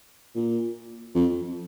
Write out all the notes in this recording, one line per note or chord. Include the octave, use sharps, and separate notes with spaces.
A#2
F2